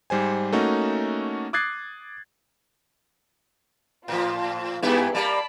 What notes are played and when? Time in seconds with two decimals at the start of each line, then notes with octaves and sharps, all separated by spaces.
0.10 G#2 G3 C5 G#5
0.53 A3 A#3 C#4 D#4 F#4
1.53 D6 D#6 F#6 G#6 A6 C7
4.08 A2 F3 F4
4.83 G2 B3 E4 G4 G#4
5.15 G3 A#3 D5 A5 B5